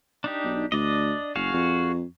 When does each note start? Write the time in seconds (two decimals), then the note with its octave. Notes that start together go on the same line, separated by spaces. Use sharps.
0.24 D4 D#4 G4
0.44 B1
0.72 D2 D4 D5 D#5
1.36 F#1 F#4 G#4 F5
1.53 F2